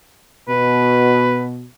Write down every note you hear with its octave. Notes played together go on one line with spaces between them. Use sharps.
B2 B4